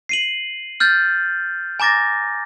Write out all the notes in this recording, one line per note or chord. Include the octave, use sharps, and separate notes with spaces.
C7 D#7 F#7
F6 G6 A6
G#5 A#5 D6 A6 A#6